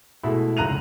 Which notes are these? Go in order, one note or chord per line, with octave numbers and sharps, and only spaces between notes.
B2 G#3 A3 E4
F1 C#2 A#5 F#6 D#7 F7